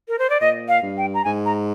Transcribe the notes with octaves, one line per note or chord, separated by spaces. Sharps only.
A#4
C5
D5
A#2 D#5
F5
G2
G5
A#5
G#2 G#5
A#5